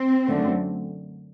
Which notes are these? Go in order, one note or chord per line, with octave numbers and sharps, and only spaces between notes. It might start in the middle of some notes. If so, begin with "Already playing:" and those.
Already playing: C4
F#2 D3 A3